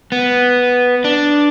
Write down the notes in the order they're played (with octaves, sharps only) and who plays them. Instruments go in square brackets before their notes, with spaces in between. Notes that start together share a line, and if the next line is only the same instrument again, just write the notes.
[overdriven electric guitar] B3
D4